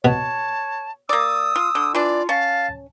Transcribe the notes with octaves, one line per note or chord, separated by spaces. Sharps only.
B2 C#5 A5
A#3 D5 D#6 E6
F4
D3
E3 D4 F4 D5
C#4 F5 A5